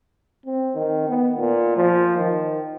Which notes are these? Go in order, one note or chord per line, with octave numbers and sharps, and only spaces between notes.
C4
D#3
B3
A#2
F3
D#3